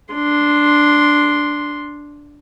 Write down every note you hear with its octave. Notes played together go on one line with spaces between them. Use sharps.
D4 C6